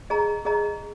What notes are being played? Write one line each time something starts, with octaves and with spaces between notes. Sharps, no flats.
G#4 D#5 A#5
G#4 D#5 A#5